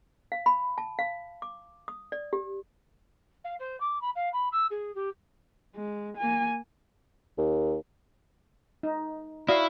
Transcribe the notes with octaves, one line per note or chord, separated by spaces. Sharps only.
F5
B5
A5
F5
D6
D#6
D5
G4
F5
C5
D6
B5
F5
B5
E6
G#4
G4
G#3
A#3 G#5
D#2
D#4
E4 F#4 D5 F5 D#6